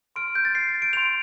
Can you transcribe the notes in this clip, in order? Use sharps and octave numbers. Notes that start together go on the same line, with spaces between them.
C6 F6 D7
G6
A6
C7
D7
C6 G6 F7